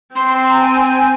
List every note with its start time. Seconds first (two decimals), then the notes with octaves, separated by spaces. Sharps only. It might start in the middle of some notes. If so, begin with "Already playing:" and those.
0.15 C4 C6
0.27 C6
0.38 C6
0.49 A#5
0.61 G#5
0.83 G#5